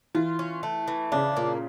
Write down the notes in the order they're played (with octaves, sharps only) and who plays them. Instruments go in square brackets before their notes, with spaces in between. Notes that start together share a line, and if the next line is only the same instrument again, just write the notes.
[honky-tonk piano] E3 [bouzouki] F4
[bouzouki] C#4
A3
E3
[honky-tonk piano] C#3 [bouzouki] D4
[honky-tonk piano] A#2 [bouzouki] A#3